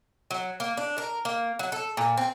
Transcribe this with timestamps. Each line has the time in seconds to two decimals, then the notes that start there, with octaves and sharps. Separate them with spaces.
0.31 F#3
0.60 A#3
0.77 D4
0.98 A#4
1.25 A#3
1.59 F#3
1.72 A4
1.97 A#2
2.17 C4